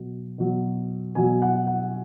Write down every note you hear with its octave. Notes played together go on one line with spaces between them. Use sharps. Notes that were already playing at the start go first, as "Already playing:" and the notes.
Already playing: B2 F#3
B2 F#3
B2 F#3 G#5
F#5
F#5